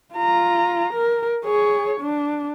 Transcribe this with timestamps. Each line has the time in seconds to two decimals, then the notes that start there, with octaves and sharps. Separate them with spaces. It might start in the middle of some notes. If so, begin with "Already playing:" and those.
0.15 F4 A#5
0.94 A#4
1.45 G#4 C#5
2.01 D4